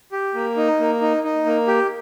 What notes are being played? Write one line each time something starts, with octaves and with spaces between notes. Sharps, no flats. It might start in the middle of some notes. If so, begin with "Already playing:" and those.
G4
A#3
D#4
A#3
D#4
D#4
A#3
G4